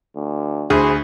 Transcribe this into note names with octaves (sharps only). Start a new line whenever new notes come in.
D2
D2 E4 F#4 G#4 C5